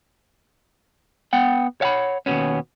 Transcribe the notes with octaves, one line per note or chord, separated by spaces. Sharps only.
B3 F#5 G5
C#5 F5 F#5 B5
D#2 G#2 B2 B3 C#4